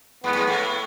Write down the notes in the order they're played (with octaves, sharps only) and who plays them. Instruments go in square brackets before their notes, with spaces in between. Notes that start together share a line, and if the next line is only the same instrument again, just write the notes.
[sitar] G#2 G#3 [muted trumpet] B3
[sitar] G#2 G#3
A2 A3